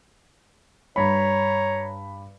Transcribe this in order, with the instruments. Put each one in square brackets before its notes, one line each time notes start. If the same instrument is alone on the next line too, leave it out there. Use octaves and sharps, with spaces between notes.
[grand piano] G2 B5 [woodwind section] C#5 A#5